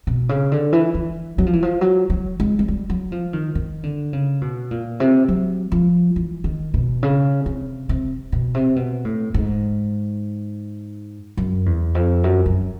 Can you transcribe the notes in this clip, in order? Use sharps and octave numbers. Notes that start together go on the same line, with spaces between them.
B2
C#3
D3
E3
E3
F#3
F3
E3
F3
F#3
F#3
G#3
G#3
G3
F#3
F3
D#3
D#3
D3
C#3
B2
A#2
C3
F#3
F3
E3
D#3
B2
C#3
C3
C3
B2
C3
B2
A2
G#2
F#2
E2
F2
F#2
F#2